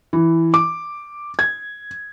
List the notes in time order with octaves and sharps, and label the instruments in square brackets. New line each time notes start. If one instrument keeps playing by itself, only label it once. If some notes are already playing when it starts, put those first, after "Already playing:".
[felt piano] E3
D6
G#6